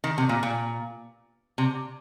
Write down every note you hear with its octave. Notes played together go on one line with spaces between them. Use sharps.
D#3
C3
A#2
A#2
C3